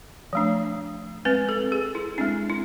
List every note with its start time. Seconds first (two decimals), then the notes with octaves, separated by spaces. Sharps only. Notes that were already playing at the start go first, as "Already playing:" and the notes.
0.33 F3 A3 D4
1.25 G#3 C4 B4
1.49 A4
1.72 G#4
1.95 E4
2.18 G#3 C4 D4
2.50 E4